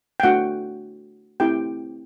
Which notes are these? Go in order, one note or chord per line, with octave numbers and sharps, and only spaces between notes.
G5
A3 D4 F#4 F#5
A3 C4 E4 G4 G5